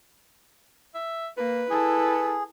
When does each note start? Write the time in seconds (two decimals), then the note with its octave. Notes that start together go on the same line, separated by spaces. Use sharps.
0.94 E5
1.37 A#3 B4
1.70 E4 G#4 A4